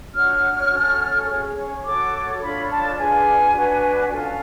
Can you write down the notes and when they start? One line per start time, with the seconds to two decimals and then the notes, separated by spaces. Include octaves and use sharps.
0.14 D4 F#4 C#5 F6
0.70 C#4 F#4 A4 C#5
1.28 C#4 G#4 C#5
1.84 F#4 A4 C#5 D6
2.41 D4 F4 A4 C#5 B5
2.70 A5
2.98 D4 F4 G#4 B4 G#5
3.55 D4 F#4 B4
4.12 C#4 F4 A4